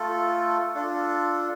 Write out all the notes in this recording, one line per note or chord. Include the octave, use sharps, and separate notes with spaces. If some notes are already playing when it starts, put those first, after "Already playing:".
Already playing: A3 F4 A4
D4 F4 A4